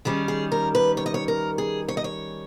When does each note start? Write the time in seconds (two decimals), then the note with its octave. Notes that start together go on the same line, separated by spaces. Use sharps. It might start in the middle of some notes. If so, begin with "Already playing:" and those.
0.05 D#3 G3 C#4 G#4
0.28 G#4
0.52 A#4
0.75 B4
0.97 C#5
1.06 D#5
1.14 C#5
1.28 A#4
1.58 G#4
1.88 C#5
1.97 D#5
2.04 C#5